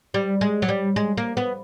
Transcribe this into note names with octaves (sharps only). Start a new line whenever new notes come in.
G3
G#3
F#3
G3
G#3
A#3
B3